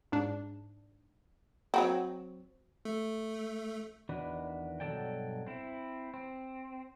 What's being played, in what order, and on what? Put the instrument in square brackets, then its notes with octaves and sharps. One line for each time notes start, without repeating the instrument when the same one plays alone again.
[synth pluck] G#2 D4
[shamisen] F#3 C4 F#4 [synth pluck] G5
[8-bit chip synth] A3
[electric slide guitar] E2 D#3 D4 F#4 B4
G2 B2 F#3 A4 D5 G5
C4 E4
C4